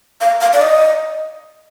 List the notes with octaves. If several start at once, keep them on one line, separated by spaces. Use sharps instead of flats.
F5
F5
D5
D#5